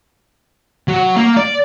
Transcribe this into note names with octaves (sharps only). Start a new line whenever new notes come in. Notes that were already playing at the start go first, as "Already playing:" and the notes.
F#3
A#3
D5